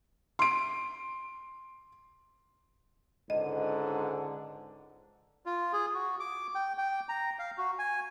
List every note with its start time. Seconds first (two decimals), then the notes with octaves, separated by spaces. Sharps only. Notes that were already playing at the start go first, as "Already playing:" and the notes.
0.39 C6 D7
3.30 C#2 G#2 D3 D#5
5.46 F4
5.73 G#4
5.94 F#4
6.20 D6
6.55 G5
6.78 G5
7.09 A#5
7.39 F5
7.58 F#4
7.79 G#5